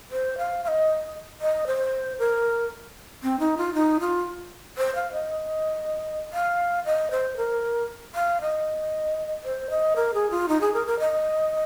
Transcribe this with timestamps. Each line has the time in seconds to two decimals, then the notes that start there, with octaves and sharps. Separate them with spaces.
0.12 C5
0.38 F5
0.64 F5
0.68 D#5
1.42 D#5
1.67 C5
2.19 A#4
3.23 C4
3.39 D#4
3.58 F4
3.74 D#4
4.00 F4
4.78 C5
4.95 F5
5.12 D#5
6.33 F5
6.86 D#5
7.11 C5
7.37 A#4
8.15 F5
8.41 D#5
9.45 C5
9.70 D#5
9.96 A#4
10.14 G#4
10.31 F4
10.49 D#4
10.61 G#4
10.74 A#4
10.87 A#4
11.00 D#5